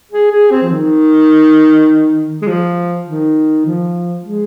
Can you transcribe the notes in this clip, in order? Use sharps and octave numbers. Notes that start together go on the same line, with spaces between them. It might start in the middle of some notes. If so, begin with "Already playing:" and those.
G#4
G#4
C4
F3
D#3
G#3
F3
D#3
F3
G#3